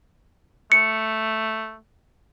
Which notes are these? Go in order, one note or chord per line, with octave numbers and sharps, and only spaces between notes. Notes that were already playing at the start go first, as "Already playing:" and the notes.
A3 C#7